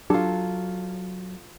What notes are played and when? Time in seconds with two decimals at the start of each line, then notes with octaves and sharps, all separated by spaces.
0.10 F#3 D4 F4 G4 A4